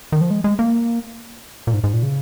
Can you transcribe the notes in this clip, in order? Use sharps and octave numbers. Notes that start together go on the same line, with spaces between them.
D#3
F3
G#3
G#3
A#3
A#2
G#2
G#2
A#2
C#3